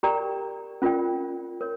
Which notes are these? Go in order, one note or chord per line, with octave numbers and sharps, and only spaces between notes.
G4 A#4 D5 G5 A#5
C#4 F4 A#4 D5 G5
A#4 C#5